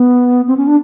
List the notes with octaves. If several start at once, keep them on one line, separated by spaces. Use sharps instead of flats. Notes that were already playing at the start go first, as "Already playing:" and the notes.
Already playing: B3
C4
C#4
D4